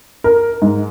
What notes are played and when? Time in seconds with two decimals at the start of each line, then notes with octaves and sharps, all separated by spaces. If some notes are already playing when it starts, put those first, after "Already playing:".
0.24 A#4
0.62 G#2